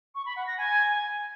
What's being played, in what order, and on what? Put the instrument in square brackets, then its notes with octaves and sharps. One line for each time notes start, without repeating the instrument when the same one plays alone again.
[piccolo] C#6
B5
F#5
A#6
G#5